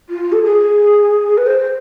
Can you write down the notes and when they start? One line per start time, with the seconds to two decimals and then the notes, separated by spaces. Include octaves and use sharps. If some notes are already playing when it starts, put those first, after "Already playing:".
0.10 F4
0.32 A4
0.44 G#4
1.38 B4
1.46 C5